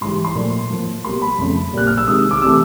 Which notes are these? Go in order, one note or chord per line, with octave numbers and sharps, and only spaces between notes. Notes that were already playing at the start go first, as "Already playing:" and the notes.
G#2 E3 G3 C6
C6
A#2 F3 A3
A2 F3 A#3
B2 G3 A#3 C6
B5
F2 C#3 F3 A3
A#2 G3 A#3 F#6
F6
E6
C3 D#3 G#3 D#6
D6
C3 E3 A3 E6